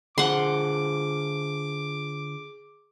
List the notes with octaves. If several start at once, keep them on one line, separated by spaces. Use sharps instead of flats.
D3 F4 G#4 C5 F#5 C6 D6